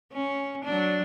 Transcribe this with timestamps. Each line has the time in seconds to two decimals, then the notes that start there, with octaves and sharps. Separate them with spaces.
0.13 C#4
0.65 F#3 D4